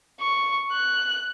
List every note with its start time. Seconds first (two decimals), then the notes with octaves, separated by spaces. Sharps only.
0.20 C#6
0.72 F#6